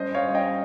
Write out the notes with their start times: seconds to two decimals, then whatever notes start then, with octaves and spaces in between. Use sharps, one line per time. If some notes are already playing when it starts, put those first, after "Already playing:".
Already playing: G2 C#4 C5 D#5
0.15 C#5 F5
0.25 G3
0.35 D#5 G5